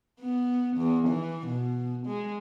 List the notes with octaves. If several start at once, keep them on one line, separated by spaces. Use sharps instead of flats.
B3
E2
E3
B2
G#3